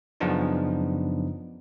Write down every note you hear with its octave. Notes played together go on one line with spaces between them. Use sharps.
F#2 C#3 F3 B3 D4 D#4